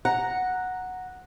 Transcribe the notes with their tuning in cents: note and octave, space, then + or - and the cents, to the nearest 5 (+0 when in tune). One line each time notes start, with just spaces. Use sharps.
F#5 -5 A#5 +0